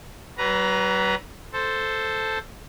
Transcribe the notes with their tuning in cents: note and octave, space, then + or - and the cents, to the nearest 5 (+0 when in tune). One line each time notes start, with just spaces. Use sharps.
F#3 +45 B4 +0 A#5 +10
A4 +0 C5 +0